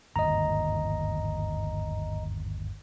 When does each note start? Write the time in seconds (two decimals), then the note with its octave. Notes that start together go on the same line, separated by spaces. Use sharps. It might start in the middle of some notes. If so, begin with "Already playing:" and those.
0.16 G1 D#2 G#2 D#5 A#5